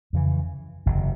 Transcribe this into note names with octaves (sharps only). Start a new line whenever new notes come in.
F2 C#3 E3
F#1 E2 C3